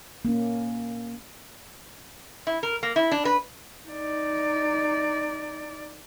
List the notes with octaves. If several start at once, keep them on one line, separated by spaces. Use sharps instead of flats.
A#3 C#4
E4
A#4
A#3
E4
D4
B4
D#4 D5